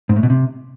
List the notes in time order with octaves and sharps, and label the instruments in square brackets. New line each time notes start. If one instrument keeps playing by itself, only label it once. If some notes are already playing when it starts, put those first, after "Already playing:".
[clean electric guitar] G#2
A2
B2
C3